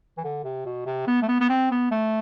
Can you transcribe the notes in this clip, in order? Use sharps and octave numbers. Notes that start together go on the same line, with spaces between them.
E3
D3
C3
B2
C3
B3
A3
B3
B3
C4
B3
A3